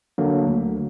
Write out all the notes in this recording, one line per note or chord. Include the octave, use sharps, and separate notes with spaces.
D3 F#3 A#3
D2